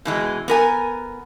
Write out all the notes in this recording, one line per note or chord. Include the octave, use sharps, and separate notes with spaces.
B2 E3 G#3
B3 A#4 G#5